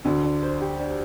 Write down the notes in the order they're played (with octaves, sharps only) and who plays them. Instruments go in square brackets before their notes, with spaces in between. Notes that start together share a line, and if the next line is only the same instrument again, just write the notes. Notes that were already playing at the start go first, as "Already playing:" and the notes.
[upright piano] D2 D3 [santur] D4
[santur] D4
C5
G4
D4